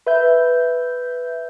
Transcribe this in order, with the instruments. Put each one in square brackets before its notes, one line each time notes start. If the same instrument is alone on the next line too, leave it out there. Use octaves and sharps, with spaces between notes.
[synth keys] B4 E5 G6